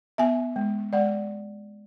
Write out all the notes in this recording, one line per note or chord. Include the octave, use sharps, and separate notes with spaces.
B3 E5 G#5
G#3
G#3 D5 F#5